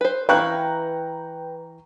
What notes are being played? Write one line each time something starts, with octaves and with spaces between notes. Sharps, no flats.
B4 C5
E3 E4 B4 F5 G5 A#5 C#6 F#6